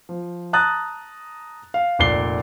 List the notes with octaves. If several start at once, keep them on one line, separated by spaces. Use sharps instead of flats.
F3
A5 A#5 D#6 F#6 A6
F5
F1 A#2 D5 C7 G7